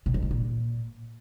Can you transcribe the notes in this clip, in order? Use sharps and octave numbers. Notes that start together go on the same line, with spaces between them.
B2
F2
B2
A#2